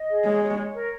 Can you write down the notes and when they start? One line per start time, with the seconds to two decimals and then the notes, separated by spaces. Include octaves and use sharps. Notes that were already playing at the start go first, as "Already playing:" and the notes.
Already playing: D#5
0.09 G#4
0.25 G#3 C#5
0.42 C#5
0.58 C#5
0.74 A#4